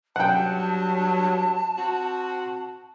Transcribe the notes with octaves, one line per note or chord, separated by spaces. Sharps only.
G2 F#3 F#5 G5 A5
C4 F#4